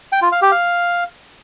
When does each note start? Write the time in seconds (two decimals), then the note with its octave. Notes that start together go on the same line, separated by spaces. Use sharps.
0.12 G5
0.22 F4
0.32 F5
0.42 G4
0.52 F5